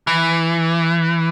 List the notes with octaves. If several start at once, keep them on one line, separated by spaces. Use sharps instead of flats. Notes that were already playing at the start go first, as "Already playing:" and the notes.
E3